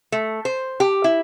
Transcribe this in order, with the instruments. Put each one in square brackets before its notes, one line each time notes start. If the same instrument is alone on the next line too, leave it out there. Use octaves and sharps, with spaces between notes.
[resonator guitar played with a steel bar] A3
C5
G4
E4